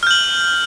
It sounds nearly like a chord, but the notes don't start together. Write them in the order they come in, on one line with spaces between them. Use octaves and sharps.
F6 G6 F#7